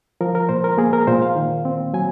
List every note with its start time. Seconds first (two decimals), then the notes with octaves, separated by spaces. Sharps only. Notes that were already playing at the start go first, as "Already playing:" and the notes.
0.21 F3 A#4
0.35 A#4
0.49 A#2 C5
0.64 A#4
0.78 A#3 G#4
0.93 A#4
1.07 A#2 C5
1.22 F5
1.36 D#3
1.65 C4
1.94 F#3 G#5